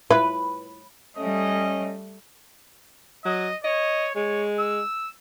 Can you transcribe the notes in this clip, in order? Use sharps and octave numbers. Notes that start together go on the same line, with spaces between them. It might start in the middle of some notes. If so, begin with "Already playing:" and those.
E4 F4 B4
G3 A3 C#4 D#5
F#3 D#5
C#5 D#5
G#3 C#5
E6